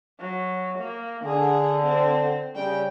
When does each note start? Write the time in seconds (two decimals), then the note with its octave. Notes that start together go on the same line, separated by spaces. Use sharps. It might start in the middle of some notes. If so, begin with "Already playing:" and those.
0.20 F#3
0.78 A#3
1.24 D3 G#4
1.83 C4
2.55 C#3 G3 G5